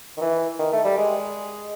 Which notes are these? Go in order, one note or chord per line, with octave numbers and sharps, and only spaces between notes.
D#3
E3
D#3
A3
G3
G#3